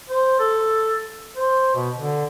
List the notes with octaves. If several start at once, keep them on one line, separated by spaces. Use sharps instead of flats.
C5
A4
C5
B2
D3